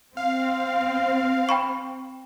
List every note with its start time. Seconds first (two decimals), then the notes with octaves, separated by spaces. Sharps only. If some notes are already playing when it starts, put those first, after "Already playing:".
0.17 C4 F5
1.49 G5 B5 C#6